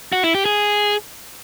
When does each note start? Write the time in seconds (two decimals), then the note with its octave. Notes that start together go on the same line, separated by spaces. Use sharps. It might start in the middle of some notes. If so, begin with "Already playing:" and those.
0.13 F#4
0.24 E4
0.34 G4
0.45 G#4